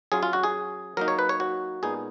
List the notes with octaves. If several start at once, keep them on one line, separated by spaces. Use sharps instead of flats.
F#3 C#4 F4 G#4
F4
F#4
G#4
F#3 A#3 D#4 A#4
C#5
B4
C#5
F#4
A#2 G#3 B3 D#4 G#4